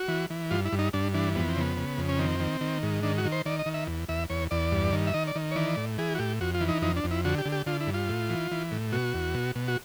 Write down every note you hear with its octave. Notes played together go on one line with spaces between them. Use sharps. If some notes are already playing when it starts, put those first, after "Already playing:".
Already playing: F#4
E3
E3
G2 F4
E4
G2
D#4
G2 D4
E3 D4
F2 B3
C4
C#3 B3
C#3
F2
C#4
D#3 C4
D#3
D#3
G#2
D#3 D4
F#4
D#3
C5
D#3 D5
D#5
D#3
E5
E2
E2 E5
E2 C#5
E2 D5
G2
D#3
E5
D#3 D#5
D5
D#3
C#5
E3 D5
A2
E3 G#4
F#4
A2 G4
F2 F#4
F4
E3
D#4
F2 D#4
D4
F2
E4
D3 F#4
G4
D3
G4
D3 F4
E4
G2
F4
A2
E3
E3
A2
B2 F#4
E2
B2
B2
F#4